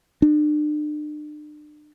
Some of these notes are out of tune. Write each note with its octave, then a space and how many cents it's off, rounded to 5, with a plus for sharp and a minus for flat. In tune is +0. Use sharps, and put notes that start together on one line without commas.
D4 +40